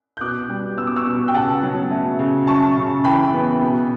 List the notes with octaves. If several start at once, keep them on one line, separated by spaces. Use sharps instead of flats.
G6
B2 D6 F#6
G3
B3 E6
D6
C#6 E6
B2
G5
C#3 F#5 A5
F#3
A3
C#3
F#2 A5 C#6
C#3
E3 G5 B5
B3
B2